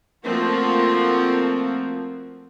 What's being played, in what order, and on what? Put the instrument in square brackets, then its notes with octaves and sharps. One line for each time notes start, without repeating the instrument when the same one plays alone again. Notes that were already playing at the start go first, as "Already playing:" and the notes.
[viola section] F3 A3 A#3 C4 F#4